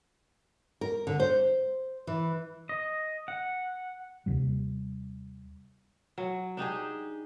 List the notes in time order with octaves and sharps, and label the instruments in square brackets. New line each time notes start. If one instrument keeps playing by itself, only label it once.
[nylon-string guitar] A#4
D3
C5
E3
[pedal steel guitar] D#5
F#5
[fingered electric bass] D#2 C3 G3
[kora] F#3
D4 D#4 G4 G#4